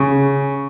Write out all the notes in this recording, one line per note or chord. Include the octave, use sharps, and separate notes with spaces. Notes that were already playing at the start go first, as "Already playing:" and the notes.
Already playing: C#3